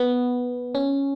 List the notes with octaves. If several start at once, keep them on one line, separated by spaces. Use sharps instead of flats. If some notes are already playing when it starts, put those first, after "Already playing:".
Already playing: B3
C#4